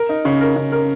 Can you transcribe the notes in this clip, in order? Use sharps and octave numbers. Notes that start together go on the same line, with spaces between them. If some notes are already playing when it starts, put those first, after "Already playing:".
Already playing: A#4
D#4
C#3
A#4
C#3
A#4